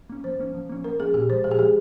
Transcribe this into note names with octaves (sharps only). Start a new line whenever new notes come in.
A#3 C#4
F3 C5
A#3 C#4
F3
A#3 C#4
F3 A#4
A#3 C#4 G#4
A#2 G4
F3 G#3 C5
A#2 G#4
G4
F3 G#3 G#4